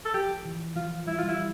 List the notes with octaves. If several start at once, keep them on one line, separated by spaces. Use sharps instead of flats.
A4
F3 G4
E3
F3 F4
G3 E4
F4
G3
E4